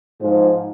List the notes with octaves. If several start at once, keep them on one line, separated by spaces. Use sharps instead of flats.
G#2 F3